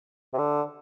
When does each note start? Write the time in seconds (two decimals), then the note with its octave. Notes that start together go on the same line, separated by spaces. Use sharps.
0.33 C3
0.38 D3